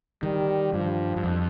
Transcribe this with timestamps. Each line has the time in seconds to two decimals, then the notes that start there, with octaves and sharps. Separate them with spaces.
0.22 D#3 G3
0.73 G2 F3
1.16 G2
1.24 F2